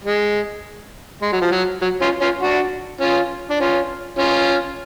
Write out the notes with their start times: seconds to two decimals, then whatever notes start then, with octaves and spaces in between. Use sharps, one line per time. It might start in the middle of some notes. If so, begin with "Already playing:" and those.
0.04 G#3
1.22 G#3
1.32 F#3
1.42 F3
1.51 F#3
1.82 F#3
2.02 C#4 F4
2.21 C#4 F4
2.41 D4 F#4
3.00 C#4 F4
3.50 D4
3.60 C#4 F4
4.19 C#4 F4